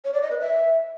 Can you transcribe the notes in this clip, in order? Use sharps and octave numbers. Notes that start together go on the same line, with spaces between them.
C#5
D5
D#5
B4
E5